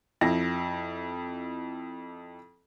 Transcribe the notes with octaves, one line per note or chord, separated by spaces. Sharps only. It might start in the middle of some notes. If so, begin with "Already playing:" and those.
F2 E4 A#6